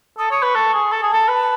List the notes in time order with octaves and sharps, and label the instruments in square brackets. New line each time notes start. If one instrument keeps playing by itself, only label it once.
[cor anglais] A4 [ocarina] D#6
[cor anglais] C#5 [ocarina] D#6
[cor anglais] B4 [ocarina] C#6
[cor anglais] A4
G#4
[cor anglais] A4 [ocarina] A5
[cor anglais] G#4
A4
B4